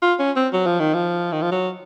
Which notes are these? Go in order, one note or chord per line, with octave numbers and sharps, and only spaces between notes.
F4
C#4
C4
F#3
F3
D#3
F3
D#3
F3
F#3